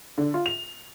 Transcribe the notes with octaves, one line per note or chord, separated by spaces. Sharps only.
D3
F4
F7